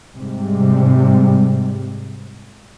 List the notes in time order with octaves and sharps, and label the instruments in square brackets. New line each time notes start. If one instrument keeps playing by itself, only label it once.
[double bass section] G#2 C3 G3